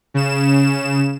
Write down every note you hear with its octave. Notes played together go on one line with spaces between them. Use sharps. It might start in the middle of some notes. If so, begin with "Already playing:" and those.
C#3 E7